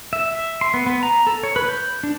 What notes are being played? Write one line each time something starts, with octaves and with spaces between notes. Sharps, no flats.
E5
E5
C6
B3
B3
A#5
A4
C#5
B4
G6
D4